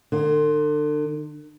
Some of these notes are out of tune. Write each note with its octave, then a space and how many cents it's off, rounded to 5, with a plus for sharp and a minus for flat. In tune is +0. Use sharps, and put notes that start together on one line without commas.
D3 +40